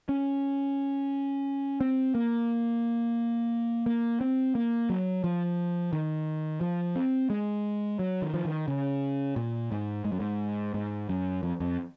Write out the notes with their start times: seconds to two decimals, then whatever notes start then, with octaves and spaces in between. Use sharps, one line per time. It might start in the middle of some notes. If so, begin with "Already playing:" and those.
0.09 C#4
1.81 C4
2.15 A#3
3.86 A#3
4.21 C4
4.55 A#3
4.90 F#3
5.24 F3
5.93 D#3
6.61 F3
6.96 C4
7.30 G#3
7.99 F#3
8.22 D#3
8.34 F3
8.45 D#3
8.68 C#3
9.36 A#2
9.71 G#2
10.05 G#2
10.12 F#2
10.20 G#2
10.74 G#2
11.09 F#2
11.43 F2
11.60 F2